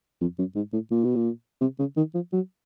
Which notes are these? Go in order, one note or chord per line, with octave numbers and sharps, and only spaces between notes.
F2
F#2
G#2
A2
A#2
B2
A#2
C3
C#3
D#3
F3
F#3